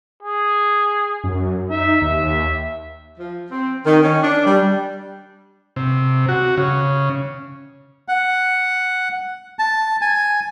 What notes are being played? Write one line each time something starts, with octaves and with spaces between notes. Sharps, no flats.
G#4
F#2
D#4 E5
D#2 E5
F3
C4
D#3
C#4
D4
G3
C3
F#4
C#3
F#5
A5
G#5